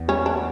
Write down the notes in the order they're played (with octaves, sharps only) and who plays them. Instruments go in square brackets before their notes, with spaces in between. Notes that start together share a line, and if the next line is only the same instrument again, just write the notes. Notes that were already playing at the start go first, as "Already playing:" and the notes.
Already playing: [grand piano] E2
[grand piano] G3 [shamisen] C#4
[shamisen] D4